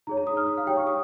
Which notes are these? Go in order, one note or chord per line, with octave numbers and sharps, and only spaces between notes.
D#4 G#4 C#5 A#5
A#5
D#6
F6
D#6
F5
G4 C#5 G5
C#6
D#6